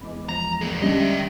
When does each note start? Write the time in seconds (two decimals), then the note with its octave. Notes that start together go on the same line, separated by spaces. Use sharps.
0.01 E2 G#3 B5 D6
0.29 F3 A#5
0.61 A#3 G#4
0.82 D3 G3 G#3 C#4 D4 D#5
1.00 E5 G5